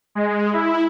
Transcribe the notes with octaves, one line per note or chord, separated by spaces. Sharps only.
G#3
E4